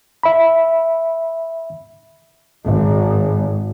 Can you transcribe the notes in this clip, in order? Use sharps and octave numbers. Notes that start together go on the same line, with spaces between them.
E5 B5
G#1